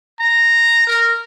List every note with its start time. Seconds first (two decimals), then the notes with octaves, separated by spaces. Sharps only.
0.20 A#5
0.87 A#4